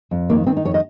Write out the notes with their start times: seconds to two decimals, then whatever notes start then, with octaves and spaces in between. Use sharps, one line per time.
0.11 F2
0.29 D#3 A#3
0.47 D#3 C4
0.57 D#4
0.65 F2 C#5
0.74 D#5